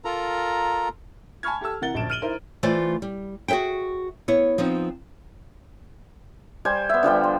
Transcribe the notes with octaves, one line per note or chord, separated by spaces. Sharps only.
F4 A4 A#4 A#5
G#5 A5 B5 C#6 F6 G#6
G4 A4 A5 E6
C3 E3 A#4 F#5 A6 G7
D1 A#1 F#2 A5 D7 E7
F6 D7 D#7 F#7 G7
D#4 E4 A#4 C5
E3 A3 F4 C5 D5
G3
F#4 G#4 C5 E5 G5
B3 E4 C#5
F3 B3 C4 D#4
G3 C5 G#5
B3 E5
D3 F3 G3 G5
C6